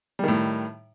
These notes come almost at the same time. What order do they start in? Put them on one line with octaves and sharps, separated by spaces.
G3 D#3 A2